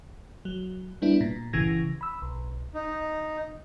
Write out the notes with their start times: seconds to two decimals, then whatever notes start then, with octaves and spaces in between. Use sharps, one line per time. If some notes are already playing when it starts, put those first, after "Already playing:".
0.45 F#3
1.02 G3 B3 D4 E4
1.21 A#2
1.53 G1 C#3 E3 G#6 A#6
2.01 B5 E6
2.22 B1
2.74 D#4